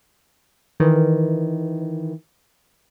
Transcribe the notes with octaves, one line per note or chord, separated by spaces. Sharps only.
D#3 E3